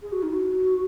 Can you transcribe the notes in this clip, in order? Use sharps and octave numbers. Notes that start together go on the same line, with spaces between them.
G#4
F#4
D#4
F#4